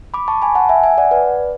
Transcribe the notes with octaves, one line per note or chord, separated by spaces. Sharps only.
B5 D6
A5 C#6
G#5 B5
F#5 A5
E5 G#5
E5 G#5
D5 F#5
B4 D5